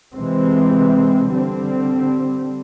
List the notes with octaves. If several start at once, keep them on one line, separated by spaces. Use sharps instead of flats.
C3 E3 G#3 C4
D3 G3 C4